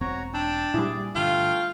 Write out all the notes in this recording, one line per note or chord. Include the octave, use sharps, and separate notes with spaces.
E1 C4 F#4 C#5 A#5
D4 G5 A5 E6
A#2 G3 E4 G#4 D5
G2 D3 A3 F4 G5 F6